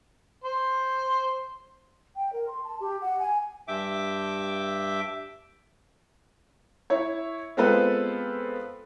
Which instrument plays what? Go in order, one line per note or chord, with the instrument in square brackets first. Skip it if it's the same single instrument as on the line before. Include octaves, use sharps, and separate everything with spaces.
[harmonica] C5
[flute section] G5
A#4
C6
A5
G4
F#5
G#5
[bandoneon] G2 E5 G5 D6
[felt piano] E4 C#5
G#3 B3 C4 F4 A4 B4